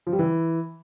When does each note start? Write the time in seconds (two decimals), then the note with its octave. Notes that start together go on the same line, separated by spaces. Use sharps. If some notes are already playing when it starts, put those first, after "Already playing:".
0.07 F3
0.13 G3
0.19 E3